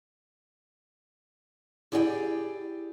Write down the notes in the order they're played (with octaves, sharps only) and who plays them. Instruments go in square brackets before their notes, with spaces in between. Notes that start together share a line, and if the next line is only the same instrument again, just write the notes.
[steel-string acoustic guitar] E4 G4 G#4 D5 F#5 G5